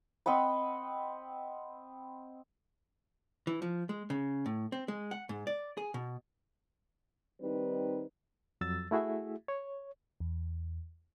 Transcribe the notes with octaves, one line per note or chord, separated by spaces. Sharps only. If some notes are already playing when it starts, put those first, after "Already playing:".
C4 D#5 F#5 B5
E3
F3
G#3
C#3
A2
C4
G#3
F#5
G#2
D5
G#4
B2
D#3 G3 C4 D#4 B4
F2 F#3 E6 A6
A3 E4 F#4 G#4 E5
C#5
E2